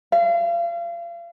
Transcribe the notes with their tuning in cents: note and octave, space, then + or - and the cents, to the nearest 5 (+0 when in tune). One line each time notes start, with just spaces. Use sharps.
F5 -35